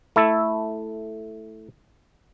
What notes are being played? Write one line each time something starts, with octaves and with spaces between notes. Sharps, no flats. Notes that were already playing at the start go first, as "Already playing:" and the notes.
A3 E4 A4